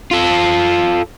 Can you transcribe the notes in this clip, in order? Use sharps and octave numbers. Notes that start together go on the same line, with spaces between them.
F4 A4